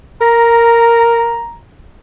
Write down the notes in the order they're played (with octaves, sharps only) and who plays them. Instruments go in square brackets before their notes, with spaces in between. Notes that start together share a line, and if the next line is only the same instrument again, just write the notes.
[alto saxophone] A#4 [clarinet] A#5